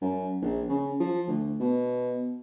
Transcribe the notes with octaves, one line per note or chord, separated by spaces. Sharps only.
F#2
A#1
C#3
F3
D2
B2